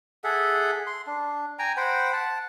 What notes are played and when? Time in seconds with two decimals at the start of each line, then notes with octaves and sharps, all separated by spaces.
0.24 G#4 A4 E5 F#5
0.87 C6
1.07 D4
1.59 G5 G#5 A#5
1.77 C5 F#5 G5 B5
2.13 F#5 A5